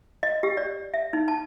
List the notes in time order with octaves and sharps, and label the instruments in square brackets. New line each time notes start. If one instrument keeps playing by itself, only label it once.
[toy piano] D#5
G4
D5
E5
D#4
A5